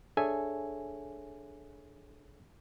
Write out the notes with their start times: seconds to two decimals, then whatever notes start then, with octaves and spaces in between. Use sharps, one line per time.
0.17 D4 G#4 A4 C#5 E5 G#5